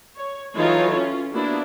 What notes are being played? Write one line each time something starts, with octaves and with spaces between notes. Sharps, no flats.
C#5
E3 F#3 D#4 F4 A4 C#5
C#4 F4
A#3 B3 D4 E4 F#4